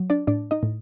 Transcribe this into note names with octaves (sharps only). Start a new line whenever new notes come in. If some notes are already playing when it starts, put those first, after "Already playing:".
Already playing: F#3
D4 D5
A2 D4 D5
D#4 D#5
A2